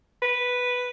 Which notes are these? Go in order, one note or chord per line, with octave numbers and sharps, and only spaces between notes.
B4